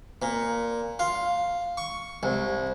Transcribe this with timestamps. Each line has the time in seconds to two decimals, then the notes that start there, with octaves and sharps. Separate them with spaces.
0.22 A#2
0.99 F4
1.77 C#6
2.23 C2